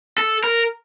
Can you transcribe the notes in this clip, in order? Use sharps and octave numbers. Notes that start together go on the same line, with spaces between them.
A4
A#4